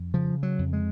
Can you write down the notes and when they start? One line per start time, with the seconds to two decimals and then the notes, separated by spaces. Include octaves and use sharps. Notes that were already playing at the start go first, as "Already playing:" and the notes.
Already playing: F2
0.14 C#3 F3
0.43 F#3
0.59 F2
0.73 G#3